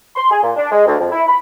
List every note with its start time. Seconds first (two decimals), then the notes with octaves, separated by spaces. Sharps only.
0.16 C6
0.30 G#4
0.42 A#2
0.56 D4
0.71 G#3
0.86 D2
0.99 F2
1.11 E4
1.27 B5